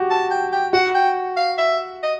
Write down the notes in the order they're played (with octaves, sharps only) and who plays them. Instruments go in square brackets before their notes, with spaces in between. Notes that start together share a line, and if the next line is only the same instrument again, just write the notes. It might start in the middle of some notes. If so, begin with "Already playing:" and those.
Already playing: [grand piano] F#4 G4
[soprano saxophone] A5
G5
G5
[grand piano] F#4 [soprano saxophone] F#5
[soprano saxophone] G5
F5
E5
D#5